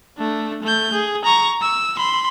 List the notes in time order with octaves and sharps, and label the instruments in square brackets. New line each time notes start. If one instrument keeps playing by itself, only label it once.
[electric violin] A3 D4
A3 G6
G#4
A#5 C#6
E6
B5 C6